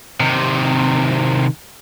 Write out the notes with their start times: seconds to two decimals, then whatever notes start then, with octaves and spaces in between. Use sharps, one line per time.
0.20 C3 D#3